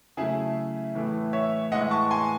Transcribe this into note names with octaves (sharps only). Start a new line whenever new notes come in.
C#3 F#3 A3 E4 G#4
A2 E3 A3
C#5 E5
A2 E3 G#3 D#5 F#5
A5 C#6
G#5 C6